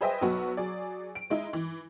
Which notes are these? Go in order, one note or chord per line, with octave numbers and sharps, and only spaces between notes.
G#4 B4 C5 D#5 E5 G5
B1 F#3 B3 F#4 F#5
F#3 G#4 D5
D7
G#3 D#4 E4
E3